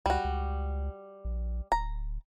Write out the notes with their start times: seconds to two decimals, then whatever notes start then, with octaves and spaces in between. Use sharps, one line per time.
0.06 C#2 G3 F#4
0.25 C#2
1.25 A#1
1.72 D1 A#5